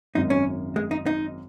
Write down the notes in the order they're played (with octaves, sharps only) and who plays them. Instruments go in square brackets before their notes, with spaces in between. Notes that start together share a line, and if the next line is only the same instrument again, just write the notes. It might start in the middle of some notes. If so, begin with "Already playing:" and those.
[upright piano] G#1 F#2 D#3 [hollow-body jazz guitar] D#4
[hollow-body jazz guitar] C#4
G#3
D#4
D#4